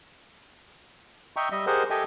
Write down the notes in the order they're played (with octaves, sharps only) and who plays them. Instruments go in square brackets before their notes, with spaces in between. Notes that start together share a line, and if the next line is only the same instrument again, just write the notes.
[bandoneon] D#5 E5 G5 A#5 C#6
G3 D#5 E5
G4 G#4 A#4 C5 D#5 F#5
G4 A4 D#5 E5 G5 G#5